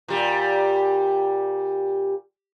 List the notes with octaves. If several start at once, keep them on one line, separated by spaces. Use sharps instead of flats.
A#2 G3